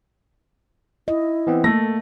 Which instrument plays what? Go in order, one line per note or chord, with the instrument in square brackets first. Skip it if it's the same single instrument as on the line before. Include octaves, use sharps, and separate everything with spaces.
[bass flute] E4 [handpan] D#5
[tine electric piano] E3 B3 C4
[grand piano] A3 A#6 [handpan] A#3 [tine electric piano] A4